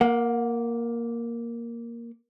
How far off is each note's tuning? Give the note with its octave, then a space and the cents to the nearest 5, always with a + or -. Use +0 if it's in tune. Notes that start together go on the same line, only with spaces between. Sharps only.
A#3 +5 F#5 -30